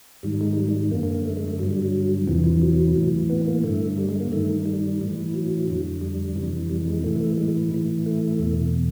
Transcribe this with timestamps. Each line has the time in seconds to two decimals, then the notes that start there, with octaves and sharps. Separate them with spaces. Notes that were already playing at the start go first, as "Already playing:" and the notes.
0.23 G#2 D#3 G3
0.41 G#3
0.57 G3
0.69 G3
0.91 F#2 A#3
0.95 D3
1.03 A#3
1.14 A#3
1.25 A3
1.37 G#3
1.48 A3
1.59 G2 F#3
1.63 D3
1.71 G3
1.82 F#3
2.27 E2 C3 E3 F3
2.44 F3
2.62 F#3
2.96 A2 E3
3.30 B3
3.47 A#3
3.63 G2 D3 A3
3.98 G3
4.09 G#3
4.20 A#3
4.31 G2 D#3 A3
4.66 G3
5.00 A2 E3
5.34 F#3
5.68 F2 D3
6.01 G3
6.36 F2 C3 E3
6.70 G3
6.87 G#3
7.04 A2 E3 A3
7.21 A3
7.38 G#3
7.72 A2 E3
8.06 A3
8.40 E2 B2